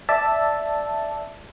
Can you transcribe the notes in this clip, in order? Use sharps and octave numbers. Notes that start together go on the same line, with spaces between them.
D5 E5 A5